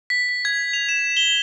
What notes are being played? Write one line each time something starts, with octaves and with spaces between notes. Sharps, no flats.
B6
B6
G#6
F7
E7
G7